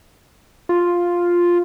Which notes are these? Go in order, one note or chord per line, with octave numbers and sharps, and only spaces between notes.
F4